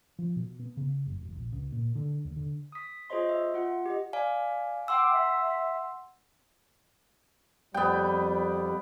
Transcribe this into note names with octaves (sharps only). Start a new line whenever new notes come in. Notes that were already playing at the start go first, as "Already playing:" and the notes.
F3
B2
B3
C#3
F#1
E1
A#1
C#2
A#2
D3
D#2
D3
D#6 B6
F4 G#4 C5 C#5 D#5 C6
E5
F4 F#5
G4 D#5
D5 F5 G#5
F#5 G5 C6 D6 E6
E5
F2 G3 B3 G5